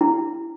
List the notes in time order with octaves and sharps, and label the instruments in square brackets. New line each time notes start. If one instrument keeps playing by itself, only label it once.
[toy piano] E4